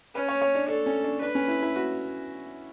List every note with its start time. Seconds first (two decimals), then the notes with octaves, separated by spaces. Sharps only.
0.15 C#4 B4
0.29 C#5
0.42 C#5
0.55 D4
0.68 D4 A4
0.86 C#4
1.04 D4
1.21 D4 B4
1.35 C#4
1.48 E4
1.62 E4
1.76 F#4